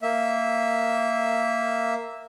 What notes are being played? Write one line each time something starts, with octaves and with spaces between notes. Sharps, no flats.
A#3 E5